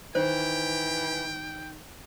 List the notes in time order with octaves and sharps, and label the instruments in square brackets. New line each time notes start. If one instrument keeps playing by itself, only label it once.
[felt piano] D#3 [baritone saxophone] E3 [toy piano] C5 [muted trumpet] G5